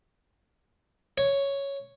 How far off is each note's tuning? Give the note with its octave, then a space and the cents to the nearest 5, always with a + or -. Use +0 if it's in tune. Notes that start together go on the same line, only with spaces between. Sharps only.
C#5 +0